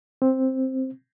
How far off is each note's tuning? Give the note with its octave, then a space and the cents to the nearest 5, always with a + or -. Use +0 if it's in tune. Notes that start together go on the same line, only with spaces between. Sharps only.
C4 +5